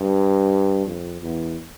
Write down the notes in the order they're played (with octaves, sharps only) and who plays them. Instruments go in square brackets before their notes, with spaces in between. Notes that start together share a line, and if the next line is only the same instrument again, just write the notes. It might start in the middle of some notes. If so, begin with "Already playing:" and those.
Already playing: [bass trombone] G2
F2
E2